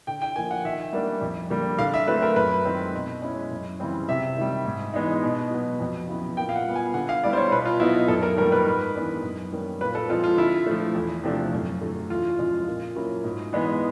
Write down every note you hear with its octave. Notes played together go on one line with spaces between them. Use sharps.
D3 G5
G5
F3 A#3 G#5
F#5
D#3 E5
G3 A#3 D4
F2
D3 G3 A#3
D3 F5
E5
F#3 A3 C4 B4
A#4
F#2 B4
D#3 G#3 C4
B2
G#3 C#4 E4
F#2
C#3 E3 G3 C4
C3 E5
D#3 G3
G#2
E3 G#3 B3 D#4
B2
F#3 B3
F2
C#3 F#3 B3 E4
A#2 G5
F5
F#5
G3 B3
G#5
D3 F#5
F5
G3 B3 E4 D5
C5
C#5
B2 B4
F4
F#3 B3 D#4 E4
F#2 A4
A#4
D#3 G3 A#3 A#4
B4
G#2
E3 G#3 B3 D4
F#2
D#3 G3 A#3 C#4
A#2 B4
A4
F3 G#3 C4 F4
F4
D3 E4
F3 A3
E2
C3 F3 A3 D4
F#2
D3 F#3 A3
E2 F4
C#3 F3 G#3
A#2
F#3 A#3 C#4 E4
G#2
E3 G#3 B3